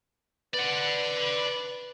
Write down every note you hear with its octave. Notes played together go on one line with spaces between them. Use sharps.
B4 D5 F#5